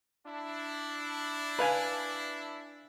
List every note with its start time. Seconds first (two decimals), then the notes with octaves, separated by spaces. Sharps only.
0.26 D4 E4
1.59 B4 F5 G#5